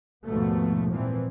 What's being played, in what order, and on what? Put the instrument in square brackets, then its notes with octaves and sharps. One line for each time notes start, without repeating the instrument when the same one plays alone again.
[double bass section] D#2 G#2 B2 F3 A3 B3
A#2 E3 F3 C4